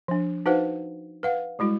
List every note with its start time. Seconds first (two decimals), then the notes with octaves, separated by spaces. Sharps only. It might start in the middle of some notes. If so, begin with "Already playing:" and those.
0.08 F3 D4
0.46 D#4 F#4 B4 C5 F5 F#5
1.23 B4 F5 F#5
1.59 G3 G#3 E4 F#4